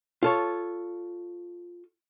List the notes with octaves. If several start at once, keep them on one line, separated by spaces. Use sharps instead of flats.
F4 A4 C#5